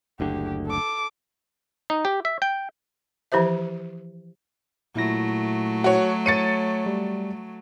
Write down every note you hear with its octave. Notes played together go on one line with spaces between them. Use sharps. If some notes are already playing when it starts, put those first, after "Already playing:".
F#1 D2 D3 G4
A4 D6
D#4
G4
E5
G5
E3 F3 E4 G4 C5 E5
A#2 F#3 A3 E4 A#6
F#4 C#5
C#5 A6 C#7 D#7
G3